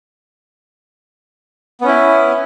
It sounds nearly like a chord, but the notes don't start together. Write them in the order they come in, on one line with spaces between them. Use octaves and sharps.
B3 C#4 E4